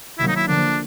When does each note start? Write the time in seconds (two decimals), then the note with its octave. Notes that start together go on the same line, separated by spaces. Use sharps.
0.19 C3 D#3 F#3 A#3 E4
0.28 D#4
0.36 E4
0.48 D3 F3 A#3 D4